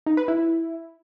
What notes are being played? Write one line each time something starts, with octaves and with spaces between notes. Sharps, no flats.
D#4
B4
E4